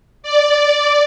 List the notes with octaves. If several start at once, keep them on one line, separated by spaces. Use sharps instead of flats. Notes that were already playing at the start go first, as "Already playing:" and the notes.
D5